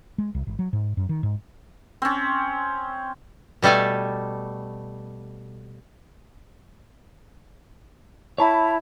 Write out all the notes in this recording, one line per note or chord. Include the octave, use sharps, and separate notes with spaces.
G#3
C2
G#1
F#3
G#2
F#2
D#3
G#2
C4 C#4
B2 G3 A3 A4 G#5
E4 C#5 A5 B5